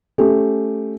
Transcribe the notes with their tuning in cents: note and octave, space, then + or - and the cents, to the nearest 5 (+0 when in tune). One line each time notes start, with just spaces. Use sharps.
A3 +0 C#4 +0 G4 +5